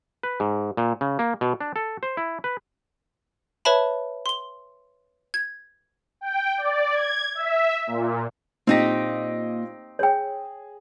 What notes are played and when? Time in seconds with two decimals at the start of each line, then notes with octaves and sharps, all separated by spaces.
0.23 B4
0.40 G#2
0.77 A#2
1.01 C#3
1.19 A#3
1.41 B2
1.61 D4
1.76 A4
2.03 C5
2.17 E4
2.44 B4
3.65 B4 C#5 E5 A5 B5
4.26 C6 G7
5.34 G#6
6.21 G5
6.58 D5
6.94 G#6
7.35 E5
7.87 A#2
8.67 A#2 C4 D#4 G4 D#5 A#6
9.99 G#4 C#5 G5